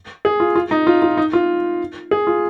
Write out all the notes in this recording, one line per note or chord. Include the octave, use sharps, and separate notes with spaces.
G#4
F4
F4
D#4
F4
F4
D#4
F4
G#4
F4